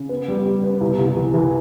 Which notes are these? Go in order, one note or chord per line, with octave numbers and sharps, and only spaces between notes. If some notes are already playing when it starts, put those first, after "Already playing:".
Already playing: C#3
B3
G3
G3
B3
C2
C2
E3
E3